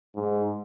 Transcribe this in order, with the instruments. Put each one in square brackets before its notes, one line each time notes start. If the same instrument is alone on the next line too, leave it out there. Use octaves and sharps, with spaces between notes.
[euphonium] G#2